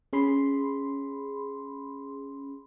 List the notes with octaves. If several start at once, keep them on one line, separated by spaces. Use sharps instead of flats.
C#4 G#4 B5 C6